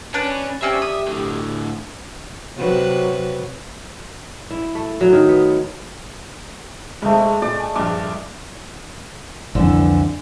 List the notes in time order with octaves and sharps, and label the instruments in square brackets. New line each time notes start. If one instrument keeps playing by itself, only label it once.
[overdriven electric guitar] C#4 [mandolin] D4 B4 F#6
[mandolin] C4 C#4 D5 [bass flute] G4 [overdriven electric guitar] E5
[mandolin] D#6
[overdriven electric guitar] A2 D3
[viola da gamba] C3 F#3 B4
[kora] E4
A3
F#3
D#3
B3
[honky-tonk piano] G#2 C3 [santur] G#3 A3
[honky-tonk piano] A#2 [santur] D5
[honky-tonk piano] G#5
[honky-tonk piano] A#1 G2 F3 [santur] D6
[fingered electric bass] C2 F2 [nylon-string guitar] D3 E3